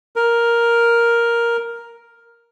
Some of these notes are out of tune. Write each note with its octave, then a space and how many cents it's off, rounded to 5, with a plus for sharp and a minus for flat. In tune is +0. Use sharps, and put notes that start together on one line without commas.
A#4 +5